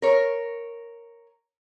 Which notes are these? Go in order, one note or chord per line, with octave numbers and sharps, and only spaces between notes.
A#4 C#5